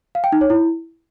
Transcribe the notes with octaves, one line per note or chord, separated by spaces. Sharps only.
F5
G5
D#4
C#5
E4